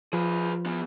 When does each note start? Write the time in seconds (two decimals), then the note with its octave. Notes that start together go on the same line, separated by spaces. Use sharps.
0.13 F3 G#4 B4
0.66 E3 B3